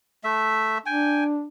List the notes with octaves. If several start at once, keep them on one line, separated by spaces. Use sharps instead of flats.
A3 E5
D4 G5 G#5